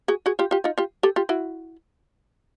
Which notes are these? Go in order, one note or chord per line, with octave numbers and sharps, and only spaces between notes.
F#4 G#4
F#4 G#4
F4 G4
F4 G4
D#4 F4
F4 G4
G4 A4
F4 G4
E4 F#4